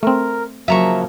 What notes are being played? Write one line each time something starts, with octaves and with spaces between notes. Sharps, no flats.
A3 C4 A#4
C#3 F3 F#3 A#3 E5 A#5 C#6